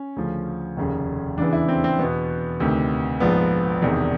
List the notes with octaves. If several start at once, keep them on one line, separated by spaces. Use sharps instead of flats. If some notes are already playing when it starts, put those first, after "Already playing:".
Already playing: C#4
D2 C#3 F3
F1 D#2 C#3
E2 C#3 E3 D4
E4
C4
C4
E2 B2 B3
D2 C3 D#3
A#1 G#2 F3 B3
E1 E2 C3 D#3